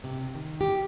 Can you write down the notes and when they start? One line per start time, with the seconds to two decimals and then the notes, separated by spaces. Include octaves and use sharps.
0.04 C3
0.35 D#3
0.61 G4